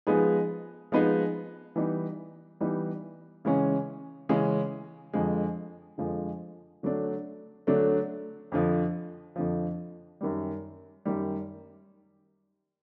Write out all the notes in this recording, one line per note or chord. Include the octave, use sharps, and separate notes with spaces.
F3 G#3 B3 D#4 G#4
F3 G#3 B3 D#4 G#4
E3 G3 B3 D#4
E3 G3 B3 D#4
C#3 E3 G#3 C#4
C#3 E3 G#3 C#4
F2 D3 F3 G#3
F2 D3 F3 G#3
D3 F#3 A3 D4
D3 F#3 A3 D4
F2 D3 F3
F2 D3 F3
F#2 D#3 G3
F#2 D#3 G3